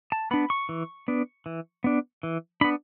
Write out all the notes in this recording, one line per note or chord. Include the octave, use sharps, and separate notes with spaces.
A5
B3 D4 B5
C#6
E3
B3 D4
E3
B3 D4
E3
B3 D4 B5